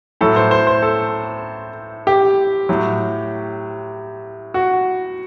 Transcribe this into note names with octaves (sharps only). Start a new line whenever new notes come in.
A2 F#3 A4
C5
C5
C5
A4
G4
A2 F#3
F#4